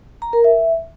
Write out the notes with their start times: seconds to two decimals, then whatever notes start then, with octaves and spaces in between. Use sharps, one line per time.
0.22 A#5
0.33 A#4
0.44 E5